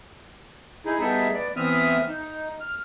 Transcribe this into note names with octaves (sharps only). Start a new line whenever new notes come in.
D#4 E4 G#4
G3 B3 D#4 G#4 A4 E5
B3 D5
E3 B3 C4 E5 D#6 F6
D#4
F6